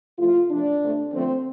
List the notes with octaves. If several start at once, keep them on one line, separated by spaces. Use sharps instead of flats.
C3 F3 A3 F4
C3 F3 A3 D4
C3 A3
D3 F3 A3 C4